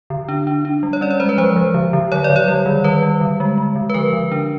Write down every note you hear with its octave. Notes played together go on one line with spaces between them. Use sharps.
D3
D4
D4
D4
G3
C#5
C#4 D5
C#5
G#3 C5
B4
F3 C5
F3
D3
D3
F#3 C#5
D5
D3
C#5
G3
D#3
G3 B4
G3
D3
G#3
G#3
D3
B4
F3 A#4
D3
D4